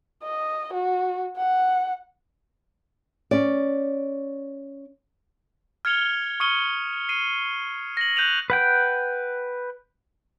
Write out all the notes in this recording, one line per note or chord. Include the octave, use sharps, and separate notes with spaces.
D#5
F#4
F#5
C#4 D5
F6 G#6 C#7 F7 G7
C#6 D#6 F6 C#7 D#7 G7
C7 D#7
A#6 F#7
F#6 G6 D#7 F7 F#7
B4 F#5 G5